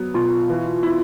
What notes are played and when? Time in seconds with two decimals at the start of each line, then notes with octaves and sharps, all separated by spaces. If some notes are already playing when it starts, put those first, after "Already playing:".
Already playing: F#3 B3
0.14 B2 F4
0.49 E3
0.83 E4